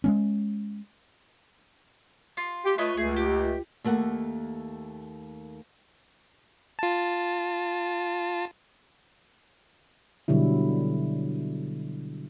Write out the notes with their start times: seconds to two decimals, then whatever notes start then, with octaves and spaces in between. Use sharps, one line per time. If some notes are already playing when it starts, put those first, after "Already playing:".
0.04 G#3 A3 C#4
2.37 F4
2.65 G4
2.78 A3 F4 B4 C#5 D#5
2.97 C#2 A3 G#4
3.16 G4
3.84 D#2 A3 A#3 F#5
6.79 F4 A5
10.28 B2 D3 F#3 G3 E4